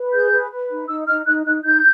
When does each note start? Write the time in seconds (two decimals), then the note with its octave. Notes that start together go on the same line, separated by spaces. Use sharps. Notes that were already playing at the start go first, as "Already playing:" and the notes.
Already playing: B4
0.13 G#4 G6
0.32 B4
0.51 B4
0.70 D#4
0.89 D#4 E6
1.07 D#4 F6
1.26 D#4 F#6
1.45 D#4 F#6
1.64 D#4 G6